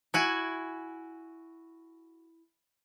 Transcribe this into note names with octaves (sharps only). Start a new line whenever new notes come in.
E4 F#4 G#5